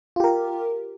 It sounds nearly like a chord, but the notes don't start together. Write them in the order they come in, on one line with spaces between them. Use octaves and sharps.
F4 G4 A#4